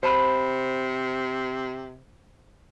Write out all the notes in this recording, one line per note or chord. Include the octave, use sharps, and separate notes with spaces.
C3 C5 A5 B5